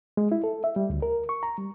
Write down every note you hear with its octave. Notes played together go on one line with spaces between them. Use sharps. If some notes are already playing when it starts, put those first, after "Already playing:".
G#3
E4
A4
E5
G3
D2
A#4
C#6
A#5
G3